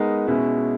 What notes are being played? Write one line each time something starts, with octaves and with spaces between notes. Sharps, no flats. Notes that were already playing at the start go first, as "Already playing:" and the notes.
Already playing: G#3 B3 D#4 A#4
B2 G#3 C#4 E4